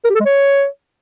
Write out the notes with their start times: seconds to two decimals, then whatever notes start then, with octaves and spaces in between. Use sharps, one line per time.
0.05 A#4
0.10 G4
0.15 A4
0.20 G#3
0.25 C#5